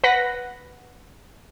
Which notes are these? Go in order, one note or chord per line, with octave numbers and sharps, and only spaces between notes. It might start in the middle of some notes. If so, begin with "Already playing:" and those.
B4 F#5 A#6 B6